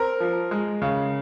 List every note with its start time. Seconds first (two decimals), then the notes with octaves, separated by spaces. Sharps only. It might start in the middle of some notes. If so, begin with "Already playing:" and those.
Already playing: C4 A#4
0.20 F3
0.51 G#3
0.82 C#3